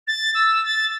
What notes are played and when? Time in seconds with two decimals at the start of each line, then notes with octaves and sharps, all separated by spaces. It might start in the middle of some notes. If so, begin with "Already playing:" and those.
0.07 A6
0.34 E6
0.65 A6